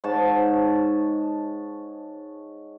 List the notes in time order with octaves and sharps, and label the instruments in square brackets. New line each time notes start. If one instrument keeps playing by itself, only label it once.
[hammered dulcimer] G#2 C#5 A5